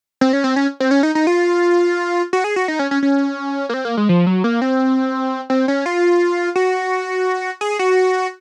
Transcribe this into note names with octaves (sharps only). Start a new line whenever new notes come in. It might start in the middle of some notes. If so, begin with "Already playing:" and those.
C4
C#4
C4
C#4
C4
C#4
D#4
D#4
F4
F#4
G#4
F#4
D#4
C#4
C#4
C#4
A#3
C4
A#3
G#3
F3
F#3
A#3
C4
C4
C#4
F4
F#4
G#4
F#4